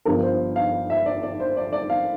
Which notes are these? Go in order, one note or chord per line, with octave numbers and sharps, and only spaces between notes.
G1 G2 F3 A#4
C5
F5
E5
D5
D5
C5
D5
D5
F5